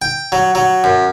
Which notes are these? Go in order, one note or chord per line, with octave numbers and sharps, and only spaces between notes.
G5
F#3
F#3
F#2